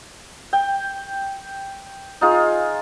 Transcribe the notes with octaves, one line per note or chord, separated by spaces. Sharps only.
G5
D#4 F4 G#4